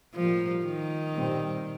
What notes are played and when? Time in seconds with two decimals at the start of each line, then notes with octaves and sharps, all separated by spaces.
0.14 A2 F3 G3 A#3
0.65 D#3
1.15 A#2 G3 C4